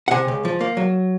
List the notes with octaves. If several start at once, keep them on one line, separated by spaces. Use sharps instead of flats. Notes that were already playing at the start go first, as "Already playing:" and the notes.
F#5
C3 G#5
C#2
F3
A#3
F#3